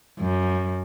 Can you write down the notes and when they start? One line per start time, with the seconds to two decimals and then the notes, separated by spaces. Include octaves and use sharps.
0.19 F#2